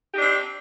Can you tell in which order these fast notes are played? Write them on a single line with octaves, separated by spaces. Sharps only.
G4 D#4 D4 C4